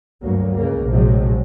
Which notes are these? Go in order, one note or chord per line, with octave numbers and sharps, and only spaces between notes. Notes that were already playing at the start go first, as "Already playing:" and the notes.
D2 G2 F#3 A#3
C#2 C#3 A#3
A#1 A2 C3 F3 F#3 G#3